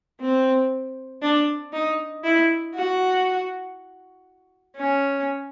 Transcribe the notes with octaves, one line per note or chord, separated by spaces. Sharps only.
C4
D4
D#4
E4
F#4
C#4